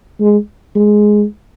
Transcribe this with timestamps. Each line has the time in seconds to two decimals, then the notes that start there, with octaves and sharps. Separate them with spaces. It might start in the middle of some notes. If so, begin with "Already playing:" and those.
0.21 G#3
0.75 G#3